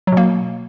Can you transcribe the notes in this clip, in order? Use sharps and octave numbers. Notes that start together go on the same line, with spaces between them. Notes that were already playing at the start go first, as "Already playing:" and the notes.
B2 F#3 A#3